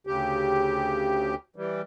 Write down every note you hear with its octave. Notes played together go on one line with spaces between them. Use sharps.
D2 C#3 G4
E3 G3